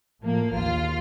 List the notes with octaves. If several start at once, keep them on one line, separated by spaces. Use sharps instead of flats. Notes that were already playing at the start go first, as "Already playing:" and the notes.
A2 F3 A#3
A#1 D#2 F4 F6